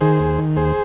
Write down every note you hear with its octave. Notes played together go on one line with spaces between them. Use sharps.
D#3 G#4 C5
D#2
D#3
D#2 G#4 C5